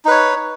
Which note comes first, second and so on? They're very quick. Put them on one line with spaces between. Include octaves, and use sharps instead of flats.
D#4 B4 C#5